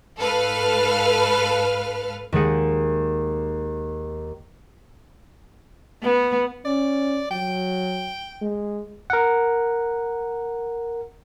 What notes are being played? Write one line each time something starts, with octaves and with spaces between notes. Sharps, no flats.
G#2 A4 B4 F5 F6
D#2 D#3 G#3 G#4 F#5 D#7
B3
C#4 D5
F#3 G5
G#3
A#4 F#5